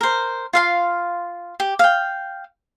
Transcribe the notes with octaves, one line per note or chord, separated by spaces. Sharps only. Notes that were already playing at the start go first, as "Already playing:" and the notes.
A#4 C5
F4 F5 C6
G4
F5 G5